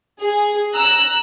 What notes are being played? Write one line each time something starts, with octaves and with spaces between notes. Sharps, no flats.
G#4
A#5 E6 F#6